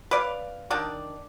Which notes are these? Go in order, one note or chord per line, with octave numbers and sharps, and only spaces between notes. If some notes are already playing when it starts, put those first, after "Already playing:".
B4 D5 F5
D#3 D4 D5